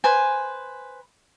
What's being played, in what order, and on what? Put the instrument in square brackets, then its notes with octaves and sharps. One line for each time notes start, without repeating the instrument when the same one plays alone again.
[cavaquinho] B4 C5 G#5